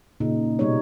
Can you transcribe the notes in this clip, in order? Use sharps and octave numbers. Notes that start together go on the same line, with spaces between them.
A#2 C#3 D#4
B2 G3 D#4 C#5